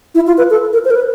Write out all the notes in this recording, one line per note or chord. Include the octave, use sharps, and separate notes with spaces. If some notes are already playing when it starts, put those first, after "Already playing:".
E4
F4
B4
A4
A#4
C5
A#4
B4